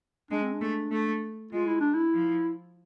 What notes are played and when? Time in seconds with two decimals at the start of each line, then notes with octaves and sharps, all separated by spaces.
0.31 G#3 D4
0.42 C4
0.53 D4
0.61 A3
0.91 A3
1.53 G#3 F4
1.67 E4
1.81 D4
1.95 E4
2.14 F3